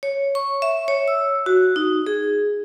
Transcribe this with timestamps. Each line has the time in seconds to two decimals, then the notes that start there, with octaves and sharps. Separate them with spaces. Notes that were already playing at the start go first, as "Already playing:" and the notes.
0.03 C#5
0.35 C#6
0.62 E5
0.88 C#5
1.08 E6
1.46 F#4
1.76 D#4
2.07 G#4